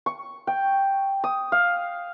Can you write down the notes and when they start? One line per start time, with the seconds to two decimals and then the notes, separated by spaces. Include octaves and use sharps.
0.06 C#6
0.47 G5
1.24 D#6
1.52 F5